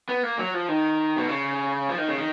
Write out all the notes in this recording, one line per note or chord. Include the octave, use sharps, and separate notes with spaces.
B3
A#3
F#3
F3
D#3
B2
C#3
F3
D#3
C#3
D#3